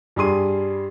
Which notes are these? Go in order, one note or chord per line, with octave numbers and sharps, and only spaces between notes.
G2 G3 G#4 C6 D#7